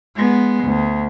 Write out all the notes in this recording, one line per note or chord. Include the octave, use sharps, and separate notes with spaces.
G#3 B3
D2